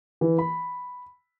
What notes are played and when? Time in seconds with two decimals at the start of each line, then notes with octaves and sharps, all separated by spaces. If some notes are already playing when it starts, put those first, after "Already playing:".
0.21 E3
0.38 B5